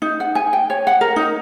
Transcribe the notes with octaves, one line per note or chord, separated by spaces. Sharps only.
D#4
F#5
G#5
G5
C#5
F#5
A#4
D#4